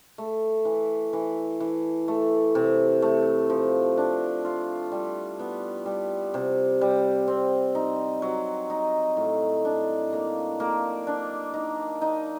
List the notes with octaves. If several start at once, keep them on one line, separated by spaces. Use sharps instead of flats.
A3
E3
E3
E3
A3
C3
A3
F3
D4
F4
G3
B3
G3
C3
G3
C4
D#4
F#3
D#4
A2
D4
A#3
A#3
D4
D#4
D#4